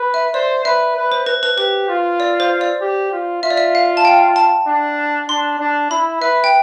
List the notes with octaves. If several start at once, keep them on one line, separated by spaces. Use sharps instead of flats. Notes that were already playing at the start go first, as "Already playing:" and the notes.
Already playing: B4
E5
C5 D5
B4 E5
B4
C5
B4
B4
G4 B4
F4
D5
C5
D5
G4
F4
F4 E5
D5
E5
F5
A5
G5
A5
D4
D4 C6
D4
E4 B5
B4 E5
G5